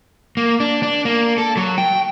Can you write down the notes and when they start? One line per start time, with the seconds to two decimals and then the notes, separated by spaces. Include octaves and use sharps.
0.37 A#3
0.60 D4
0.83 D4
1.05 A#3
1.38 A4
1.57 F#3
1.78 G5